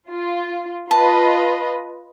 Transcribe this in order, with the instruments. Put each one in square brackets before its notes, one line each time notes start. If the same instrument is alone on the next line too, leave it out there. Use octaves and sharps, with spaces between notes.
[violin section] F4
[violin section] F4 B4 D#5 [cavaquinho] A5